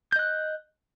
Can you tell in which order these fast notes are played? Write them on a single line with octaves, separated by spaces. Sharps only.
G6 D#5 F#6